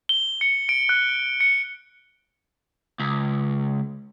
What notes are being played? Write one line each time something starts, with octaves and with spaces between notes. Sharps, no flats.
G7
C#7
D7
F#6
C#7
C#2